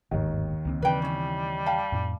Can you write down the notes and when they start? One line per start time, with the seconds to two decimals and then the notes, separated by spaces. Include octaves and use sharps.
0.11 G1 D#2 G#2 D#3
0.65 C#2 A#3 C4
0.82 C#3 E3 G3 C4 B4 G5
1.02 C#4 E4
1.66 F5 G5 A5
1.92 F2 A2